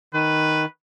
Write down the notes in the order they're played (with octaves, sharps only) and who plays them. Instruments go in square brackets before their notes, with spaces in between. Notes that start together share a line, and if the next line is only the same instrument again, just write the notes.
[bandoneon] D#3 [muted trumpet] B4